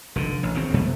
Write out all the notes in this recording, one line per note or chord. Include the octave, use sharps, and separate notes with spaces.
F1 D3
A1
G#1 C#3 C4
F2 C3 A3 B3